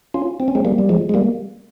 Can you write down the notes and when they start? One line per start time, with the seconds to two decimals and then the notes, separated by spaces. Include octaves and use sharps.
0.14 C#4 F4
0.40 C4
0.48 C#4
0.55 G#3 C4
0.65 G3 A#3
0.79 G3
0.89 F3 G#3
1.09 G#3
1.14 G3 A#3